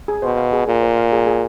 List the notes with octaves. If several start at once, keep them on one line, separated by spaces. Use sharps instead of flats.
G#4
B2 C5
F5
G#4
A#2 G#4
C5
F5
G#4
G#4